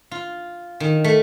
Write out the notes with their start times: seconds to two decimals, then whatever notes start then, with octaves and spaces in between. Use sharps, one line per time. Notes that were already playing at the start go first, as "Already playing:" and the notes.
0.11 F4
0.80 D#3
1.04 A3